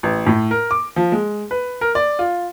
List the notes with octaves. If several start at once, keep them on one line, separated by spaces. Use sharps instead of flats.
A1
A2
A#4
D6
F3
G#3
B4
A#4
D5
F4